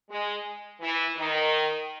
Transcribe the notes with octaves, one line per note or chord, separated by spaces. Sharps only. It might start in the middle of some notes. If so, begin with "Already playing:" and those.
G#3
E3
D#3